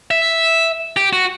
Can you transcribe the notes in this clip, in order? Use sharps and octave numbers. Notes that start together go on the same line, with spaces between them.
E5
G4
F#4